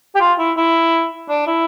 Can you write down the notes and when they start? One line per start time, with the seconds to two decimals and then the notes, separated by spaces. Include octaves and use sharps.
0.15 G4
0.20 F4
0.39 E4
0.57 E4
1.29 D4
1.47 E4